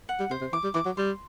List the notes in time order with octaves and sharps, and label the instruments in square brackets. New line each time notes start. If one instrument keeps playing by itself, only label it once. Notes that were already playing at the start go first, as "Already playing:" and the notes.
[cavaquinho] F#5
[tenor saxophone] G3
[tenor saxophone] C3 [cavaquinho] C5
[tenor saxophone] C3
[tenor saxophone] E3 [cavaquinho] D6
[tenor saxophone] G3
[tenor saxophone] E3 [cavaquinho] D6
[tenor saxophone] F#3
[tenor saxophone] G3 [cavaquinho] C6